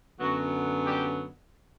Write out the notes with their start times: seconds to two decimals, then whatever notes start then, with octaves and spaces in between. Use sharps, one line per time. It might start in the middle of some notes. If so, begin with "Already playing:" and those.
0.19 F#2 D3 F#3 B3 F#4
0.86 G3 G4